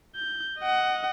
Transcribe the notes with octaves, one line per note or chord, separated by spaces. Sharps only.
G6
D#5 F#5